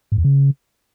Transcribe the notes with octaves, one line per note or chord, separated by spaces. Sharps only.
G#2
E2
C#3